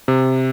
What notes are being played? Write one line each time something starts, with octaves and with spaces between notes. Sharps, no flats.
C3